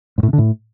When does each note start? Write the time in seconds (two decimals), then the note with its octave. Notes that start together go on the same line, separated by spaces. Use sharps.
0.18 G#2
0.23 A2
0.28 C3
0.33 D3
0.38 A2